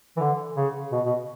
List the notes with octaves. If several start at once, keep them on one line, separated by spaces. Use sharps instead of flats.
E3
D3
C#3
B2
B2